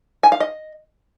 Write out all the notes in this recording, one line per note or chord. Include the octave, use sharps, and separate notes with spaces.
G#5
F5
D#5